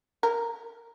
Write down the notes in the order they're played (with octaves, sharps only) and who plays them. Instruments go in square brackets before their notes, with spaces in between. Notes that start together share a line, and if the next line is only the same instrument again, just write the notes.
[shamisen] A#4